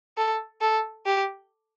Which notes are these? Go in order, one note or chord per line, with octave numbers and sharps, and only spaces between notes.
A4
A4
G4